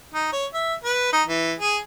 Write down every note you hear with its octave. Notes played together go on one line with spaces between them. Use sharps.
D#4
C#5
E5
B4
D#4
E3
G#4